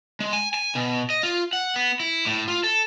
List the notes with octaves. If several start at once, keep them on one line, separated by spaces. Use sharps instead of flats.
G#3
G#5
G#5
B2
D#5
F4
F#5
B3
E4
A2
F4
A4